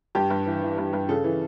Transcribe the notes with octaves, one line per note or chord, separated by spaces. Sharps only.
G2 G4
G2
E3
E3
G2
G2
C#3 A4
E3